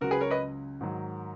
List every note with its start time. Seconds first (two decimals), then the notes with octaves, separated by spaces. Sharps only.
0.01 C#2 C#3 F#3 F#4 A#4
0.11 G#4 B4
0.21 A#4 C#5
0.31 B4 D#5
0.81 G#2 D#3 F#3